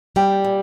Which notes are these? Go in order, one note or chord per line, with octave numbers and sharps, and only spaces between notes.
G3 G5
A#2